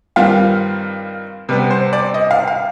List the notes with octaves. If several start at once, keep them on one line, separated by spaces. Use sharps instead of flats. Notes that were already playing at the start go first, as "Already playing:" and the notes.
G2 D#3 G3 C4 F4 F5
C3 G3 B3 B4
C5
D5
D#5
F5
F5